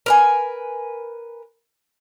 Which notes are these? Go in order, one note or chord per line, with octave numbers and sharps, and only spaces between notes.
A#4 B4 G#5